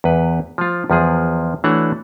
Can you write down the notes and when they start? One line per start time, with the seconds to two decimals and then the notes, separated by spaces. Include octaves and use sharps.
0.04 E2 B4
0.58 F3 F4
0.90 E2 F3 G#4
1.64 E3 A3 D4 F#4 C#5 F#5